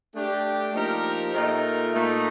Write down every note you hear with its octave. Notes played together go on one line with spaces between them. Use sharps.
A3 D4 G4
F3 A#3 D#4 G4 A#4
A#2 A3 D#4 A#4
A#2 A3 D#4